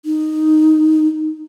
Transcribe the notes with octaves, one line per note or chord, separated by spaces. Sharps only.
D#4